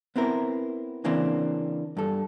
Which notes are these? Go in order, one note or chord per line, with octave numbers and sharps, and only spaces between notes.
B3 C4 E4 A#4
C#3 E3 A#3 C4 D4
G2 A4